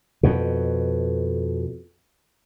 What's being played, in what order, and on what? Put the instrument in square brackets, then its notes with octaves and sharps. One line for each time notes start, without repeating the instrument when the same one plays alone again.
[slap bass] F2 B2